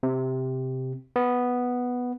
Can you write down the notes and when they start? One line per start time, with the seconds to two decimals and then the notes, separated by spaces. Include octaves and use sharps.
0.03 C3
1.16 B3